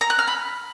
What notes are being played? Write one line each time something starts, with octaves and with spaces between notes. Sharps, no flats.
A#5
F#6
F6
B5